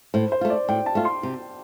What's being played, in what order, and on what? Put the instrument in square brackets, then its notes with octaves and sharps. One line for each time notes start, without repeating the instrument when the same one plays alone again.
[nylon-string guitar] A2 [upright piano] C5
[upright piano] C5
[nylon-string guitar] A3 F4
[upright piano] D5
[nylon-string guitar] A2 [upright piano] G5
[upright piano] A5
[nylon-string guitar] A3 F4
[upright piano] C6
[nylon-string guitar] C3